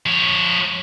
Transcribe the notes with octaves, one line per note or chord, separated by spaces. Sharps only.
F3 C#5